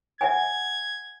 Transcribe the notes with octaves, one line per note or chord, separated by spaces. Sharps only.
E5 F#5 G#5 G#6